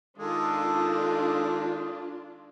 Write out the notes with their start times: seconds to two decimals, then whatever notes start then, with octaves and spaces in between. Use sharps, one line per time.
0.18 D#3 G#3 D4 F4 A4 D#6